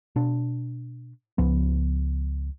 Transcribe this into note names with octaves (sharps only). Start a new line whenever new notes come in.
B2 D4
C#2 F3 B3